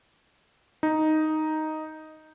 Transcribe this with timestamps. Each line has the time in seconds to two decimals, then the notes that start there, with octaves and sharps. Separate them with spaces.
0.83 D#4